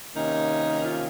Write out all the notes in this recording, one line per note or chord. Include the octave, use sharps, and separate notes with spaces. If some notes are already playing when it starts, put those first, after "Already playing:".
C3 D#3 A#3 C#4 D#4
F4